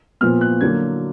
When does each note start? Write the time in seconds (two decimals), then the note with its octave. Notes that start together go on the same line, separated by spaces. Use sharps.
0.21 A#2 F3 B3 F6
0.41 F#6
0.61 D3 F#3 A#3 G#6